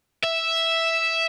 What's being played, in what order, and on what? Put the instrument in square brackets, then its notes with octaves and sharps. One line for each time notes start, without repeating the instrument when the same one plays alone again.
[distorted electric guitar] E5